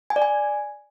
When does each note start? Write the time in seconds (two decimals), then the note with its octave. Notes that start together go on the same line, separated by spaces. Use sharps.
0.10 G#5
0.16 D5
0.22 G#5